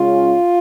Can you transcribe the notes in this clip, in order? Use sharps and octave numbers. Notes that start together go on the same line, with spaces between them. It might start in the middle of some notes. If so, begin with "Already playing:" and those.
Already playing: C#3 G#3 C#4 F4